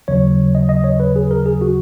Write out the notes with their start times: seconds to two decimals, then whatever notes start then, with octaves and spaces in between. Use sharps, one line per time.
0.08 D#2 C#3 F#3 C#5
0.55 D#5
0.69 D#5
0.84 C#5
1.00 B4
1.16 G#4
1.31 A#4
1.46 G#4
1.61 F#4